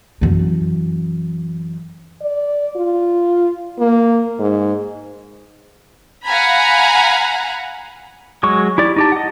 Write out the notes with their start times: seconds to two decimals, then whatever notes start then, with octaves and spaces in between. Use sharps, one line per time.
0.21 F#2 E3
2.21 D5
2.76 F4
3.79 A#3
4.40 G#2
6.25 F5 F#5 G#5 A#5 B5
8.43 F#3 G#3 C#6
8.78 E4 G4 D5
8.96 D#4 G4 A5
9.12 D#5 F#5